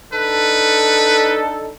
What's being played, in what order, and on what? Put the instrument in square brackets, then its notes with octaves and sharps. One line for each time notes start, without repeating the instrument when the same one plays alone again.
[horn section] D4 D#4 A4 [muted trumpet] B4